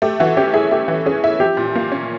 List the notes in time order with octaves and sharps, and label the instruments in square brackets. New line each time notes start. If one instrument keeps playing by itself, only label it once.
[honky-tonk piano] A3 [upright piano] G4
[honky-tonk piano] E3 [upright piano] F#4
[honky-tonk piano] C#4 [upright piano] G4
[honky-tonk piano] E4 [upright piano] G#4
[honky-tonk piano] A3 [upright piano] G4
[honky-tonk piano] E3
[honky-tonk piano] C#4 [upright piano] G#4
[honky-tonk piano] E4
[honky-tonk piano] F3 [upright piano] G4
[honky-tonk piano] A#2
A#3
C#4